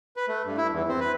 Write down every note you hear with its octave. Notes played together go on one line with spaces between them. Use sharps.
B4
A3
G2
E4
E2
C4
B4